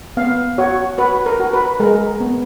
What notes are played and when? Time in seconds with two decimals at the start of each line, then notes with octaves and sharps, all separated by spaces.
0.17 B3 F5
0.58 F#4 C#5
0.98 F#4 B4
1.26 A#4
1.40 F#4
1.53 B4
1.80 G#3 A#4
2.20 B3